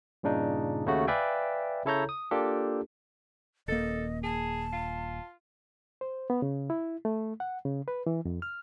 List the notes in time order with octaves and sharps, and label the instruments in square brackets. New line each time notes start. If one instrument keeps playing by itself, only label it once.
[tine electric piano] G2 A#2 C#3 D4 D#4
D#2 C#3 A3 F#4
B4 D5 E5 F5 G5 G#5
C#3 E4 A4 C#5 A#5 G6
D#6
A#3 D4 F4 G4 A4
[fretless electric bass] D#1 A#3 [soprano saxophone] A4 [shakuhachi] D#5
[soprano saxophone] G#4 [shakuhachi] A5
[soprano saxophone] F4
[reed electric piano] C5
B3
C#3
E4
A3
F#5
C#3
B4
E3
F2
F6